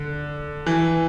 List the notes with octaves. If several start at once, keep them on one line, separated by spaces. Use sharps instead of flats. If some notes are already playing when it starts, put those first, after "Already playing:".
Already playing: D3
E3